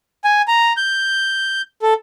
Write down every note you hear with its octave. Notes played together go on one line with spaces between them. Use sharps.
G#5
A#5
G6
A4